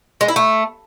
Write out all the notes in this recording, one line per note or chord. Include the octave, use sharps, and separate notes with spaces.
G#3
E4
A3